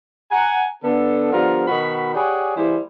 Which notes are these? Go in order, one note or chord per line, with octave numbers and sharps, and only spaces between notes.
F#5 G#5 A#5
D3 B3 A4
D3 F3 G3 B3 F4 A#4
B2 D#3 F#4 B5
G4 G#4 C#5 D5 F#5 G#5
E3 G3 A#3 E4 G#4 C5